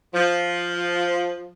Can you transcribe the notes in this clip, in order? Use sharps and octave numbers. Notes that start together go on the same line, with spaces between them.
F3